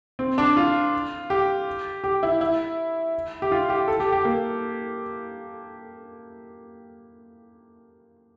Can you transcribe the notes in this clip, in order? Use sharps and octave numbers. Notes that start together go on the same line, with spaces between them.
C4
D4
F4
G4
G4
E4
E4
G4
F4
G4
A4
G4
G4
A#3